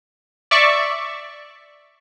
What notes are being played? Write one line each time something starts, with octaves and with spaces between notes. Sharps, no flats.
D5 E5 C#6